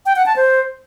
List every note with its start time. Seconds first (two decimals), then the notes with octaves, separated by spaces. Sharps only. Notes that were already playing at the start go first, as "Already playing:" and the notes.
0.06 G5
0.16 F#5
0.26 A5
0.36 C5